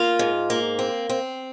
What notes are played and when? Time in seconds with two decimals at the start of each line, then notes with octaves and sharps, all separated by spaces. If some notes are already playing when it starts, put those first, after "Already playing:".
Already playing: A#3 F4
0.19 G#2
0.50 A#3
0.79 C4
1.09 C4